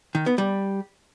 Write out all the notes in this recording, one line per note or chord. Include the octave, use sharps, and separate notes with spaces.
D#3
B3
G3